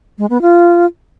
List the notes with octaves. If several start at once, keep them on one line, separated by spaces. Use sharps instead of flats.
G#3
B3
F4